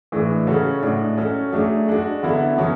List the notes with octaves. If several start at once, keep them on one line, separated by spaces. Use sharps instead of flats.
A2 E3 G#3 D4
C#3 F#3 C#4 F#4 A4
A2 G#3 D4 F#4
F#3 C#4 F#4 A4
F#3 A3 D4 G#4
G#3 D4 F#4
D3 F#3 B3 E4 A4
B2 F#3 C#4